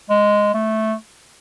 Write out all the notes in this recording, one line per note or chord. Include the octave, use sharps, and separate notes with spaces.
G#3
A3